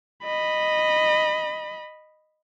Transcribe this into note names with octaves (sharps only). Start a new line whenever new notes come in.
D#5 B5